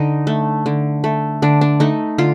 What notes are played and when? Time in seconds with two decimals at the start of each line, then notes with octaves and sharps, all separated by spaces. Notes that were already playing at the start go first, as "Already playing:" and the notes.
Already playing: D3 D#4
0.27 A3
0.66 D3
1.04 A3
1.42 D3 D4
1.61 D4
1.80 A3 D#4
2.18 D3 F4